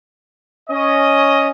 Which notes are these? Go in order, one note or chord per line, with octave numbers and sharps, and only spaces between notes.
C#4 D#5